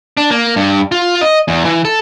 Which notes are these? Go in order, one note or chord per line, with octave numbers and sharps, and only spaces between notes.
D4
A#3
G2
F4
D#5
E2
E3
A4